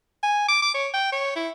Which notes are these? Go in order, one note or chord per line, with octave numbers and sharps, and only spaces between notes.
G#5
D6
D6
C#5
G5
C#5
E4